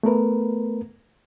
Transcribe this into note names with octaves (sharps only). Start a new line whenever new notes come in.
A3 B3 A#4 B4